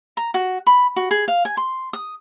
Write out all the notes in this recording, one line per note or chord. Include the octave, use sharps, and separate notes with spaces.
A#5
F#4
B5
F#4
G#4
F5
G#5
C6
D#6